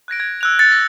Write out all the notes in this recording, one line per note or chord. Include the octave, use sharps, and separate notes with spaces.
F#6 G#6 A#6 D7
G#6
E6 F#6 F7
A6 C#7 D7
A#6